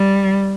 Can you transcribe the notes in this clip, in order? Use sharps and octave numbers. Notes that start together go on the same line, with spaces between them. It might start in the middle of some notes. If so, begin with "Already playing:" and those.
Already playing: G3